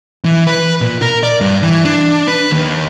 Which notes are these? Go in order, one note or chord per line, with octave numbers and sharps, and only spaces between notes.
E3
B4
A#2
A#4
D5
G2
E3
D4
B4
D#2